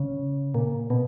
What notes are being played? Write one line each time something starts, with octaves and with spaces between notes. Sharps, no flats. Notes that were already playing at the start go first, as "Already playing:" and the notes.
Already playing: C#3
A#2
B2